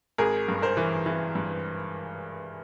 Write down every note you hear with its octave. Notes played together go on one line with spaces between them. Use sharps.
G#1 G#4 A#4
G2
A#4 C5
E3
E3
G2